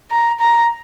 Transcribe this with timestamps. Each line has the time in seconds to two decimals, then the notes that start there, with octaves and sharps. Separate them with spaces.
0.11 A#5
0.40 A#5